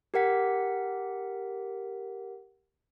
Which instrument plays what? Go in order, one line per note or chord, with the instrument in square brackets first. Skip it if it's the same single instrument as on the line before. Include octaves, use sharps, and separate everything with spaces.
[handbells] G4 A#4 F#5 B6